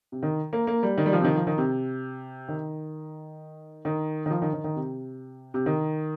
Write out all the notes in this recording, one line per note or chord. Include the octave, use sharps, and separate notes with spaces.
C3
D#3
A#3
A#3
G3
D#3
G3
F3
C3
D#3
F3
D#3
C3
D#3
D#3
D#3
F3
D#3
D#3
D#3
C3
C3
D#3